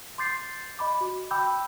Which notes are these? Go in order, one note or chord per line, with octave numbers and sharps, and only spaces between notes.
C6 D6 G6 A6 C7
D#5 B5 D6
F#4
G5 B5 D6 E6 G6